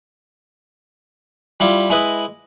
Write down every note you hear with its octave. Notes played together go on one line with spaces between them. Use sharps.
G3 E4 F4 G4
G#3 E4 B4 D#5